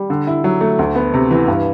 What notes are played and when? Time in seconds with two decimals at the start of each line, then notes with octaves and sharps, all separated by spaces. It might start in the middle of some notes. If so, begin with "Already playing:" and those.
Already playing: G3
0.10 D3
0.27 E4
0.44 F#3
0.61 A3
0.79 D2
0.95 B3
1.14 C3
1.31 E3
1.48 G2